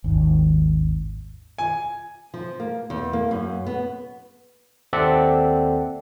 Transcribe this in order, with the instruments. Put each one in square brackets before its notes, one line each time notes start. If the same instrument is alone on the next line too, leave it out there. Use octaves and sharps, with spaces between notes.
[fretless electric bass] G#1 D#2
[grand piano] G#5
[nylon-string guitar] F3
A#3
E2
A#3
F#2
B3
[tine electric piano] D#2 C4 A4 D5 E5 F#5